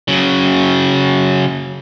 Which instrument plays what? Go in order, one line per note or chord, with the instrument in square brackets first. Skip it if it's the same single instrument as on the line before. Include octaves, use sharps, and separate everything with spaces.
[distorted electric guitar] C#3 F#3